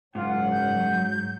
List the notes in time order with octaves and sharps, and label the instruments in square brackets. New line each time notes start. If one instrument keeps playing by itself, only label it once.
[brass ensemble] F#1 F#5 [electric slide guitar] G#2 [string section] F#3 [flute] F4
[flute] G6